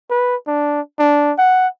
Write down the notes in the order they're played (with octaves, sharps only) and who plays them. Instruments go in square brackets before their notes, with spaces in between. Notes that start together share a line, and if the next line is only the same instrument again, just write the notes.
[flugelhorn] B4
D4
D4
F#5